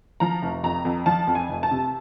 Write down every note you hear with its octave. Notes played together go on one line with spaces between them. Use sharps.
F3 A#5
F1
F2 A#5
F2
F3 A5
F2
G#5
F1
A5
C3